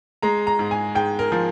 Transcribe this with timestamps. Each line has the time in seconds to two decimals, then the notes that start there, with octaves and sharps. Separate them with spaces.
0.22 G#3 A#5
0.47 A#5
0.59 G#2
0.71 G#5
0.95 G#2 G5
1.19 A#4
1.32 F3